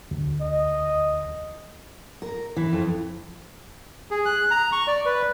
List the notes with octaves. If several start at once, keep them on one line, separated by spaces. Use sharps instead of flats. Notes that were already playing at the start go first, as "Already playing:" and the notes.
D2
D#5
A#4
E3
F2
G#4
F#6
A#5
C#6
D5
B4